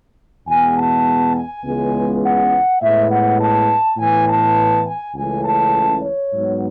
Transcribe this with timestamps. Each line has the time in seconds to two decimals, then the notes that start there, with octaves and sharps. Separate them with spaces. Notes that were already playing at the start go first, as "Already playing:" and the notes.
0.48 E2 B2 G#3 B3 G#5
0.77 A5
1.35 G#5
1.65 C#2 C#3 E3 G#3 B3
2.23 F#5
2.81 A2 G#3 B3 E5
3.10 F#5
3.40 A5
3.98 A2 E3 B3 G#5
4.28 A5
4.86 G#5
5.15 C#2 C#3 E3 A3 G#5
5.44 A5
6.02 C#5
6.32 G#2 F#3 B3